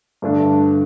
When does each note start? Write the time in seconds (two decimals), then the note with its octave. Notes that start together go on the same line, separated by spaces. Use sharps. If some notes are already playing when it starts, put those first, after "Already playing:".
0.22 G2 D3 A3 D4